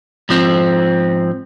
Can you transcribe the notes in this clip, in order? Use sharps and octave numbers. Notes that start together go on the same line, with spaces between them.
G#2 F3 C4